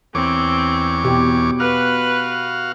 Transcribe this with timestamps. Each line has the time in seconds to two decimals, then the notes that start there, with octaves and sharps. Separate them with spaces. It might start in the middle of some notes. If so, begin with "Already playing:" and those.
0.15 E2 C4 C#5 D6
1.05 B2 G4
1.60 F#4 B4 F5